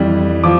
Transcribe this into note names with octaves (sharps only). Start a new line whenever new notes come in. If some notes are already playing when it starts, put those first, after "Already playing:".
Already playing: F2 E3 G3
F3 D6